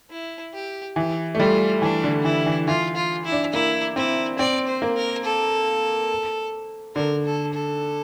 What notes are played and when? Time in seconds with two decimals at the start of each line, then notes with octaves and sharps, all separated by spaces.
0.10 E4
0.54 G4
0.96 E3 G4
1.35 A3
1.39 G3 F4
1.82 E3 D4
2.04 D3
2.24 E3 E4
2.46 E3
2.68 E3 F4
2.96 F4
3.25 E4
3.32 D4
3.53 A#3 E4
3.96 C4 E4
4.38 C4 D5
4.68 C5
4.82 A#3
4.96 A#4
5.24 A4
6.96 D3 A#4
7.25 A4
7.54 A4